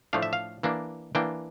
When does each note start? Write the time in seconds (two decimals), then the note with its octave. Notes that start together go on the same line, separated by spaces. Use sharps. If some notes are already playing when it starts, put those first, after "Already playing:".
0.13 A2 F3 A3 D4 F5
0.23 E5
0.33 F5
0.63 E3 A#3 D4
1.15 E3 A#3 D4 G5